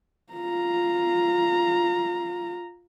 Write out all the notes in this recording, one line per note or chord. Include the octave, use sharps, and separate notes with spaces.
F4 A#5